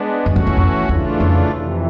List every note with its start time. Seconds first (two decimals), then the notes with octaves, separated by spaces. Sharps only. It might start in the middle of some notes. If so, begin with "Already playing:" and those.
Already playing: G#3 B3 D4
0.25 F#2 E3 A3 C#4 F#4
0.36 F2
0.47 E2
0.57 F2
0.88 E2 C#3 E3 A3 D4 F4
1.20 F2
1.51 F2 C3 E3